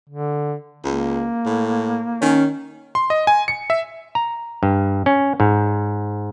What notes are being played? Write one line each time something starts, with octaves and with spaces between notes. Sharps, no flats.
D3
C#2 A#3
A2
D#3 C#4
C6
D#5
G#5
C#7
E5
A#5
G2
C#4
G#2